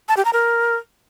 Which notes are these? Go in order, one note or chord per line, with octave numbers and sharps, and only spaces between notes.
A5
G4
A#5
A#4